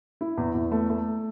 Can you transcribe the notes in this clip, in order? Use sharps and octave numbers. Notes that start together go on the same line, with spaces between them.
E4
E2
E2
A3
A3